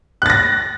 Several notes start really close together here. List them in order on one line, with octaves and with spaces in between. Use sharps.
F#6 A6 A#6